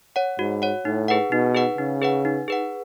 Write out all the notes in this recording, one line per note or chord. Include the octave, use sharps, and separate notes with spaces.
C#5 F#5
G#2 F#4
C#5 F#5
A2 D#4
G#4 B4 F#5
B2 D#4
G#4 B4 F#5
C#3 D#4
G#4 B4 F#5
D#4
G#4 B4 F#5